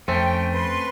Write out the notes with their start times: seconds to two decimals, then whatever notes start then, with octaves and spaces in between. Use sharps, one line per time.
0.08 F2 A3 C4 C#4 G5
0.52 B4 C6